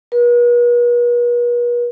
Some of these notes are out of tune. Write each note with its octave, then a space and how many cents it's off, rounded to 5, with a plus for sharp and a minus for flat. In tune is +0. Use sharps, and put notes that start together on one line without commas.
B4 -45